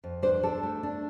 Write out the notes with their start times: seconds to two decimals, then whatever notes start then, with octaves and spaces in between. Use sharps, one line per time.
0.04 F2
0.22 D4 C5
0.43 D4 A4
0.63 A3
0.83 D4